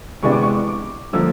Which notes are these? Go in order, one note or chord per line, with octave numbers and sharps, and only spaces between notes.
C3 E3 G#3 B3 D4 C#6
D6
C#6
D6
D3 F3 A#3 E6